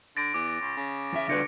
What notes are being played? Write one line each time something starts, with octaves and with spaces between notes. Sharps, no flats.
D3 A6 A#6 D7
E2 D6
C#2
C#3
E2 E5
B2 D3 D4 B4 A#6 C#7